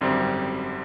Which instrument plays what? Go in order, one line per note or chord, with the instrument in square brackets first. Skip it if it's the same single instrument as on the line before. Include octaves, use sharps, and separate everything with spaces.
[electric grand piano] G#1 F#2 D3 G3 C4